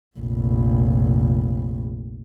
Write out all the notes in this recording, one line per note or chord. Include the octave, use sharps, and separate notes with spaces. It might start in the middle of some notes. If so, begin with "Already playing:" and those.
F1 A#1